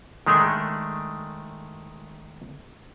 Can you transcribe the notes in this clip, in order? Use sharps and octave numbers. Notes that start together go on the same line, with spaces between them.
D#3 G#3 A3 D4